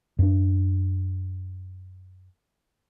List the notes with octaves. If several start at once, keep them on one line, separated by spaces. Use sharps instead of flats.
F#2 D4